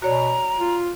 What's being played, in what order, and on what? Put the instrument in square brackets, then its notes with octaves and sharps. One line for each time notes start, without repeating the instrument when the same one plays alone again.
[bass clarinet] B2 [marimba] F#4 C#5 D5 [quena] A#5
[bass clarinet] F4